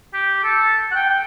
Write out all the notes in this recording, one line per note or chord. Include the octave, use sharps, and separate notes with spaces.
G4
A4
F#5
G5
G5